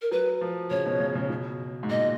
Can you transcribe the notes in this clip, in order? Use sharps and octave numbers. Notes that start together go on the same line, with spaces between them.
A#4
F#3 B4
F3
C#3 C#5
B2
C#3
C#3
B2
G#2
A#2 D#5